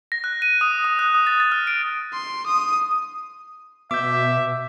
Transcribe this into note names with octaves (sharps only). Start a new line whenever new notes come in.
A#6
F#6
D#7
D#6
D#6
F#6
D#6
A6
A6
F6
D7
C6
D#6
B2 E5 D6 G6